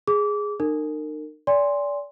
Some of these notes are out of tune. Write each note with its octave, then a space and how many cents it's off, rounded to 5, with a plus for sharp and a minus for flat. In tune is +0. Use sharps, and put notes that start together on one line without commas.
G#4 +0 D6 -25
D#4 -40 A#4 -30
D5 -30 G#5 -30 C6 +0